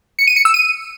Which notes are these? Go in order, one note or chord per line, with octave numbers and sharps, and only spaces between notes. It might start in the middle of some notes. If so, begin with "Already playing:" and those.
C#7
D#7
C#7
E6
D#7